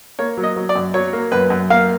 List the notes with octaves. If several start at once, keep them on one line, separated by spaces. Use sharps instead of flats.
A#3 C#5
F#3
D#5
F#3
D5
F#2
F#3 C#5
A#3
F#2 B4
F#2
A#3 F5